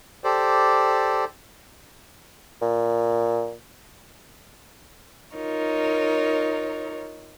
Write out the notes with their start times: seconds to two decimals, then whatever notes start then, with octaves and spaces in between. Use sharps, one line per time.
0.24 G4 A4 C5 D5
2.62 A#2
5.36 D#4 F4 A#4 C#5